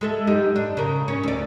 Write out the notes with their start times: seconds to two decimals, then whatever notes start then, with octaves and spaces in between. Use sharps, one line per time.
0.01 G#3 A4 E5
0.27 F#2 D#4 G4
0.56 D4
0.77 C#3 A#4
1.08 C#4
1.23 D2 D5